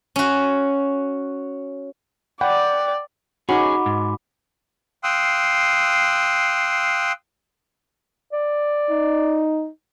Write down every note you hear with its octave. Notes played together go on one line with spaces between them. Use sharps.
C#4 F#4
D5 F#5 G5 B5
C#4 D#4 F#4 G#4 B5 D6
G#2
F5 G5 C6 D#6 E6 F#6
D5
D#4